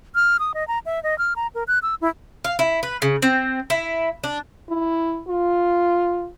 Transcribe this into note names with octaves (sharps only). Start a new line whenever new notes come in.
F6
D#6
D#5
A#5
E5
D#5
F6
A#5
A#4
F#6
E6
E4
F5
E4
B4
C#3
C4
E4
D4
E4
F4